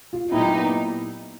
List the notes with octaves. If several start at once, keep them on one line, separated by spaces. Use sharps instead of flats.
F4
A#2 F#3 B3 D#4 E4 G4